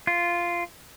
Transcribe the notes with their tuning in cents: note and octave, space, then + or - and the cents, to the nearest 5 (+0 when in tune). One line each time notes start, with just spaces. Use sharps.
F4 -10